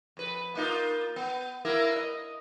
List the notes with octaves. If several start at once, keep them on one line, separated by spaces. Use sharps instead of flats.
F2 B4
A#3 D#4 F4
B3
A#3 E4 A#4
B4 D#5